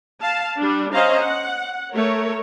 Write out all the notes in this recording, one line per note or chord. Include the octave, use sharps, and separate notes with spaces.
F5 A5
G3 D4
C#4 C5 D#5 F5 A#5
F#5
A3 A#4 C#5